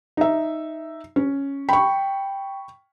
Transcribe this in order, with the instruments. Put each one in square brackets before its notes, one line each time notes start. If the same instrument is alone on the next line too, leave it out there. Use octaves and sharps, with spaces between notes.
[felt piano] D#4 E5
C#4
[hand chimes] G5 [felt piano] B5 C#6